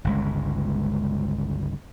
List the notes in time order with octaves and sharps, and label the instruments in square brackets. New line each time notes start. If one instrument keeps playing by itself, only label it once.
[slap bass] G1 C#2 G#3